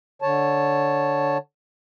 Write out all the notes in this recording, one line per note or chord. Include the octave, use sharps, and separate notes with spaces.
D3 C#5 A5